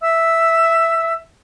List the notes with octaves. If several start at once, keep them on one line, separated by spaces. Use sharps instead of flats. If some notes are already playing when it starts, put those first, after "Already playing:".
E5 E6